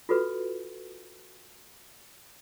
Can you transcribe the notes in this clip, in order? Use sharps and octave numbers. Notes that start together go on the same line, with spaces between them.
F4 F#4 A4 B4